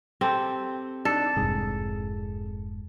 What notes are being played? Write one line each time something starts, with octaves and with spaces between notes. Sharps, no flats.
C4 G4 A4
D4 D#4 A4
F1 C2 G#2 G#4